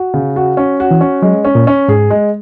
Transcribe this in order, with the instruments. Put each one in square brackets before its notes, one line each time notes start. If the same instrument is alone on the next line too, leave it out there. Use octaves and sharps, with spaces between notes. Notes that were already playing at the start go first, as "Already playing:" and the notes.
Already playing: [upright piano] F#4
C#3
F#4
C#4
F#4
[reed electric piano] E3
[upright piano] C#4
[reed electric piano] F#3 [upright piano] G#3
[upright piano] C#4
[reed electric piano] A#2
[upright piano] C#4
[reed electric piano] G#2 [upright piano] G#4
[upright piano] G#3